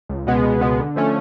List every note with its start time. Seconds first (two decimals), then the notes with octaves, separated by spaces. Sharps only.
0.09 C#2
0.27 B2 G#3 B3
0.44 C#2
0.61 B2 G#3 B3
0.79 D3
0.96 F3 A3 C#4